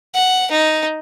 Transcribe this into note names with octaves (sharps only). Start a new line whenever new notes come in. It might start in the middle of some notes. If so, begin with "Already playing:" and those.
F#5
D#4